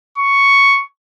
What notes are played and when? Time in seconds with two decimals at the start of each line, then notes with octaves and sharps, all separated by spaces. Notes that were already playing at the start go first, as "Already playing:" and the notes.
0.18 C#6